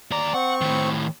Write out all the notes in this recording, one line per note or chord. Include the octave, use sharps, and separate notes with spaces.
D#2 D5 A#5
C4 F#5 C#6
A2 D#3